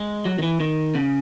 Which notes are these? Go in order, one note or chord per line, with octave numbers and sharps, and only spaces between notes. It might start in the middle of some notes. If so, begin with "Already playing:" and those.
Already playing: G#3
F#3
D#3
E3
D#3
C#3